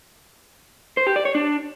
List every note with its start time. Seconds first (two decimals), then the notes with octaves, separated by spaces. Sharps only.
0.97 C5
1.07 G4
1.16 D5
1.25 C#5
1.35 D4